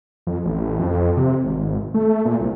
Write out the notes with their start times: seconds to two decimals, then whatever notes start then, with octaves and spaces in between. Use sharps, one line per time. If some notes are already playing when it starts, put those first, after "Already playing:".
0.27 F2
0.45 A1
0.79 F2
1.17 C3
1.44 G#1
1.94 A3
2.25 A#2
2.40 C2